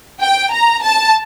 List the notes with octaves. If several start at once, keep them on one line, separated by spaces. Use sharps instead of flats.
G5
A#5
A5